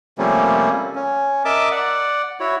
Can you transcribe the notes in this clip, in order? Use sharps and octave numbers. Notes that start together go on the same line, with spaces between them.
C3 F3 G3 A3 A#3 C#4
C#4
A#4 D#5 E5 A5 D6
D5 F#5
E4 F#4 C#5